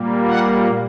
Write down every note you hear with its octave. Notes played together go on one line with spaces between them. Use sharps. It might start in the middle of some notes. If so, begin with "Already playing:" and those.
Already playing: A#2 G3 A#3
F#5